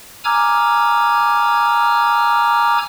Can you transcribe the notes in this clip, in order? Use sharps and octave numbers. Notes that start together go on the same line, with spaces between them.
G#5 A#5 D6 E6 F6 G#6